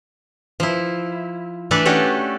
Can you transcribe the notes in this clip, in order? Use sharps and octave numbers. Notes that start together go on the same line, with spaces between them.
F3 E4
E3 A3 D4 A4 B4 D5
C#4 D4 F#4 G4 A4